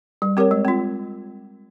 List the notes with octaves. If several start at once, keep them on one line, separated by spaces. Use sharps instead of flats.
G3
C4 G4 A#4 C#5
G#3
C4 F4